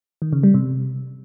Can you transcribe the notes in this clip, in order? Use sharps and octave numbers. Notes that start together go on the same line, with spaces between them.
D#3
C#3
G3
C3